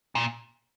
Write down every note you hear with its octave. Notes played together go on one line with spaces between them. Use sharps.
A#2